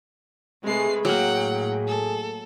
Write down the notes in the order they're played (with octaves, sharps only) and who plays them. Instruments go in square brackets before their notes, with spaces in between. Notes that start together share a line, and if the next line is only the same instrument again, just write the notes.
[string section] C3 G#3 A3 [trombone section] G#4 [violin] B4 C7
[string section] A2 [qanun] F#3 A#3 [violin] F#5 G5
[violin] A4